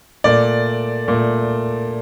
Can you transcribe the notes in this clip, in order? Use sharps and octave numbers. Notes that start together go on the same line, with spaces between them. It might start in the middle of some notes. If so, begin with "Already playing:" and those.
A#2 A3 D5
A#2 A3